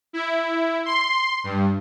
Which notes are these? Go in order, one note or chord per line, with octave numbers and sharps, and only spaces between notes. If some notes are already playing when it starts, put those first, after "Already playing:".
E4
C6
G2